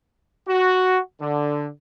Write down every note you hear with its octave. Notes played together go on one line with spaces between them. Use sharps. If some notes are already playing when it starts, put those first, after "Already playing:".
F#4
D3